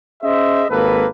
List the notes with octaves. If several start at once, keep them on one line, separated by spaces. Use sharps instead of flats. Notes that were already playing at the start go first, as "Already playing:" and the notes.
C#4 G#4 C5 D#5 E5
G#1 D#2 A#3 A4 B4